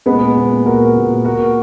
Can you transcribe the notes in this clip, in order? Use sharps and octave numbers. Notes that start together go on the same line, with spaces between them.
A#2 G#3 B3
A#2
A#2 F#4 A#4
A#2
A#2 F#4 A#4